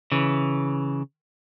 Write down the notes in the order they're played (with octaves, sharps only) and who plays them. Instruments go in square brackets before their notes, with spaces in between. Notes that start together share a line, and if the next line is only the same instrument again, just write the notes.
[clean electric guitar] C#3 E3